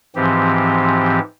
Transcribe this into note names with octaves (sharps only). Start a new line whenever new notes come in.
G#2 E3 F3 C4 G4